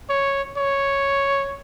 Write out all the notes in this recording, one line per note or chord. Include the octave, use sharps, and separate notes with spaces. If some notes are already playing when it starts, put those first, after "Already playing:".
C#5
C#5